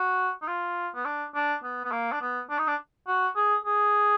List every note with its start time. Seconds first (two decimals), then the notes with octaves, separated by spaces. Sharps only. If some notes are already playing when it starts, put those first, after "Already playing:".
Already playing: F#4
0.42 D#4
0.48 F4
0.94 B3
1.05 D4
1.35 D4
1.63 B3
1.84 B3
1.91 A#3
2.12 D4
2.21 B3
2.49 D4
2.58 D#4
2.67 D4
3.07 F#4
3.36 G#4
3.65 G#4